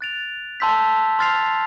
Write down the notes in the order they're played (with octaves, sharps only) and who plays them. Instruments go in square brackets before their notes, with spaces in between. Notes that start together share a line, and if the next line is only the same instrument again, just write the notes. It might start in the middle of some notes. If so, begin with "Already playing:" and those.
[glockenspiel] F#6 A6 D7 F7
A5 C6 E6 G6 B6
C6 F6 A6 C7 F7